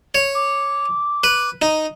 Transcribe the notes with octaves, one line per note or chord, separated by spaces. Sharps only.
C#5
D6
B4
D#4